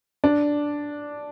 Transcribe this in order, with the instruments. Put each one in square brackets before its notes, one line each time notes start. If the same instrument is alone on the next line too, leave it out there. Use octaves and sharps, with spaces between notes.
[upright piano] D4